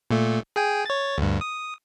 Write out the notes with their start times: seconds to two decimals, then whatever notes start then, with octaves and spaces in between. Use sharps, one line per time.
0.11 A#2 A3
0.56 G#4 G5 G#5
0.86 C#5 A6
1.18 D2 G2
1.41 D#6